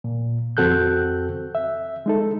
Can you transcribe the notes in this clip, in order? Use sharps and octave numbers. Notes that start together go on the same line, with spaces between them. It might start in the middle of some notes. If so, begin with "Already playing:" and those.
A#2
F2 C4 F#4 A4 F#6 G6
E5
G#3 D#4 A4